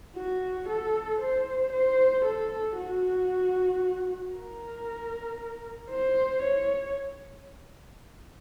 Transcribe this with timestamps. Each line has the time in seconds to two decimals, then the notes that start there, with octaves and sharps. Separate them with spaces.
0.16 F#4
0.69 A4
1.21 C5
1.73 C5
2.25 A4
2.77 F#4
4.33 A#4
5.90 C5
6.43 C#5